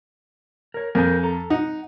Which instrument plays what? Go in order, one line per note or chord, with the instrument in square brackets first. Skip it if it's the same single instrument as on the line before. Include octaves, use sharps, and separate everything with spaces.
[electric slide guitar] A#4 C#5
[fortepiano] F2 [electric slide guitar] A#4 C5 G#5
[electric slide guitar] A4 A#5
[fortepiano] D#4 [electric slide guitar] F#5